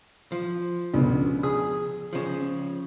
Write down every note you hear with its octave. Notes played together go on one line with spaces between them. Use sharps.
F3
C#2 B2 D3
G#4 D#6
C#3 F3